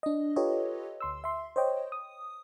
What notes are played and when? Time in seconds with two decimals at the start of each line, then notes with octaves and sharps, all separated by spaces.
0.03 D4 D#5
0.36 F4 G4 A4 B4 C#5 D#5
1.00 D2 C6 E6
1.24 E5 C6
1.56 C5 C#5 D#5 G5
1.92 D#6